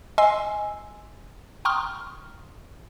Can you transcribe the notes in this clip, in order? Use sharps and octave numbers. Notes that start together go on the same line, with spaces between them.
D#5 G#5 C6 E6 C7
G5 A#5 C6 C#6 D#6 F6